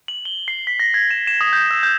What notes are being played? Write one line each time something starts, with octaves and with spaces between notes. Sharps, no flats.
F#7
G7
C7
B6
A#6
G#6
E7
E7
D#6
G6
E6
G6